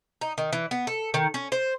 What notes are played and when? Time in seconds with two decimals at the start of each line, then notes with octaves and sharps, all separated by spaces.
0.21 D#4
0.38 D#3
0.53 E3
0.71 B3
0.87 A4
1.14 D#3
1.34 C#4
1.52 C5